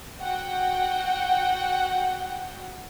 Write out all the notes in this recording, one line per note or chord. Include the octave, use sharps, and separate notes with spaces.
F#4 F#5 G5